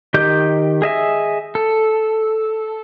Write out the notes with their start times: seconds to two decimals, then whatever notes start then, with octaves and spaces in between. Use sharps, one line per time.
0.14 D#3 G4 D#5 G6
0.82 G#4 D#5 E5 G#5
1.55 A4